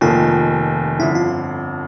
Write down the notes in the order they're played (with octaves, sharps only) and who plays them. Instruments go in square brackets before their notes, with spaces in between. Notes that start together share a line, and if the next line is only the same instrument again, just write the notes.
[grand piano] F1 D#2 D#3 [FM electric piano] F4
[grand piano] G1 F2 D3 [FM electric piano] E4
[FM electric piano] F4